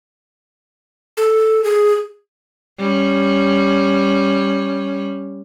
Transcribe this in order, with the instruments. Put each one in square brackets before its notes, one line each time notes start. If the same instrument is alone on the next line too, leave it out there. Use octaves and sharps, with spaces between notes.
[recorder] A4
G#4
[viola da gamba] G3 C#4